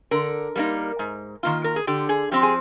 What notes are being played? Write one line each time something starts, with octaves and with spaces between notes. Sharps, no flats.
D3 A#4
G3 A#3 D#4
G#2
D#3 A#3 F4
A#4
G#4
D3 G4
G#4
F3 C4 G4
G#4